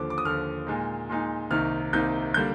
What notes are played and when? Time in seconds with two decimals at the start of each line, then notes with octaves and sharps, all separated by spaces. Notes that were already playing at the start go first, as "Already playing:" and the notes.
Already playing: D#2 D3 F3 D6
0.10 D6
0.18 D#6
0.25 D#2 D3 F3 F6
0.67 A#2 G#3 D#4
1.09 A#2 G#3 D#4
1.50 C2 C3 D#3 A#3 D#4 F6
1.93 C2 C3 D#3 A#3 D#4 G6
2.34 D3 G3 A#3 G6